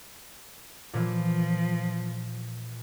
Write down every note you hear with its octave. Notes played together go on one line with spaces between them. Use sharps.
A#2 E3 F3 A#3